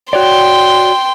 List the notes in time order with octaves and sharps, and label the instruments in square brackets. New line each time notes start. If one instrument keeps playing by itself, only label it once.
[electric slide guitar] F#4 C#5 D5 [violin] G5 C6